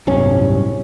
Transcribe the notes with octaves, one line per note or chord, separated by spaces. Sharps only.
D1 G1 C2 C#4